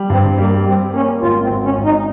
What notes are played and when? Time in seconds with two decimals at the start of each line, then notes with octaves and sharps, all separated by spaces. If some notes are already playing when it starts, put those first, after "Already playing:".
Already playing: G3
0.10 G2 C4
0.32 C4
0.37 G3 A#3
0.66 G3 C4
0.93 A#3 C#4
1.21 G#1 F4
1.42 C4
1.49 G#1
1.64 C#4
1.77 G#1
1.84 D#4